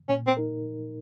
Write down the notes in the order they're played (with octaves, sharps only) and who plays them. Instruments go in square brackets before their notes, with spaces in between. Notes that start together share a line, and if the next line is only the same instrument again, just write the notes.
[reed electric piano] A#2 [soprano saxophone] C#4
[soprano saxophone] C4
[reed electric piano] D#4 A#4